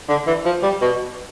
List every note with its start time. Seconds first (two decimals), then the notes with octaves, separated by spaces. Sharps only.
0.09 D3
0.27 E3
0.45 F3
0.63 G3
0.81 B2